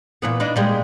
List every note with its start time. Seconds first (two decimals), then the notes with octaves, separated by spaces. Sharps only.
0.22 A#2 E3 B3
0.40 D4 D#4 B4
0.56 A#2 G3 G#3